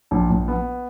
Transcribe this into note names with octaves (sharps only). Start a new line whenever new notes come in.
A#1
A#1
B3